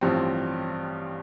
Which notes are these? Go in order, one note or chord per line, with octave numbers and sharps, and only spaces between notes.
A1 G2 F3 C4